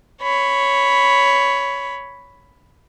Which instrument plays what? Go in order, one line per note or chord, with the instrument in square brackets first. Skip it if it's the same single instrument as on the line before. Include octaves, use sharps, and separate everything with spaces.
[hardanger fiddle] C#5 B5